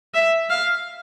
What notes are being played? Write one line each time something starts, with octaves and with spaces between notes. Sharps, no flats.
E5
F5